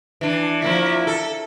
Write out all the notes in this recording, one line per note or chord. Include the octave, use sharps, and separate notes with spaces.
E3 D4
F3 A#3 E4
A4